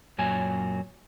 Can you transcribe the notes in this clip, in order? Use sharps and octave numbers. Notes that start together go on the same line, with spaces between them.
F#2 A#2 F#3 G#5